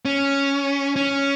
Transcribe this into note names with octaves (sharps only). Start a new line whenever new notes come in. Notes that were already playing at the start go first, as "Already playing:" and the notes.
C#4
C#4